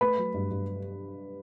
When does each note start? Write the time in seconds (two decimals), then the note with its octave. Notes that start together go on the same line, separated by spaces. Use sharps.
0.01 A3 B4 B5
0.18 F#3
0.34 G2
0.51 G2